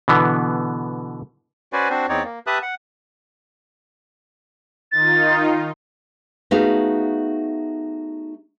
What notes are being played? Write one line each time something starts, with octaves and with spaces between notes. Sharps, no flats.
B2 D3 E3 B3
C#4 F#4 B4 C5 D5 G#5
C4 D4 F#4 C5
E2 C4 D#4 C#5 D5
A#3
G4 B4 E5 A5 D#6 F#6
F#5
D#3 D#4 F4 A6
A3 B3 D#4 F#4 G#4 F5